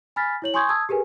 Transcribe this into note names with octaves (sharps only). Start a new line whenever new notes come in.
G#5 B5 F6 A6 B6
E4 C#5 F#7
G#5 C6 C#6 D#6 G6 G#6
A5 D#6 E6 G#6
G4 G#4 A#4 B4 G#5